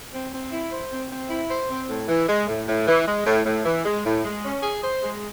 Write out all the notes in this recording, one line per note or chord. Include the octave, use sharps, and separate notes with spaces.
C4
C4
E4
C5
C4
C4
E4
C5
C4
A2
E3
G#3
A2
A2
E3
G#3
A2
A2
E3
G#3
A2
G#3
C#4
G#4
C5
G#3